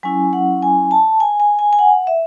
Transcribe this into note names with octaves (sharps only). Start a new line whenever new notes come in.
F#3 C#4 E4 G#5
F#5
G#5
A5
G#5
G#5
G#5
G#5
F#5
E5